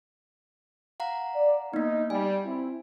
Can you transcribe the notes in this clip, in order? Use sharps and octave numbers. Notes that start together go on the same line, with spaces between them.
F5 F#5 A#5
D5
A#3 B3 D#4
G3 G#5
C4 E4